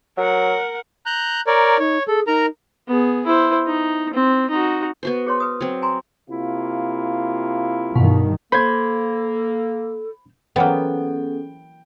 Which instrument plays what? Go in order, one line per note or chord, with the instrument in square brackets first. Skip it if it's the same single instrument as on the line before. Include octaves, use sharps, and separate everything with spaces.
[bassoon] F#3 [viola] A#4 F#5
[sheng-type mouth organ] A#5 F#6 G6
[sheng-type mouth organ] A#4 C#5 D5 [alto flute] A#5
[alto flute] D#4 [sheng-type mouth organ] C#5
[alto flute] G#4 [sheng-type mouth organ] A4
[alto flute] D#4 [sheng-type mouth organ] A#4 A#5
[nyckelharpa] B3 G#4
E4 C5
D#4
C4
D#4 F#4
[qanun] B3 F#4 C5
[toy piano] G#4 C#5 C6
B4 D#6
[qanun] F#3 C4
[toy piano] G#5 A#5 C6
[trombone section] C3 A#3 F4 [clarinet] E4
[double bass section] G2 D#3 [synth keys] B2
[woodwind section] A#3 [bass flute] A4 [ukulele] C5 [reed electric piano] B5 G#6
[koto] E3 F#3 A#3 [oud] B3 [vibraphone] C#4 G#4 A4 [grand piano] G5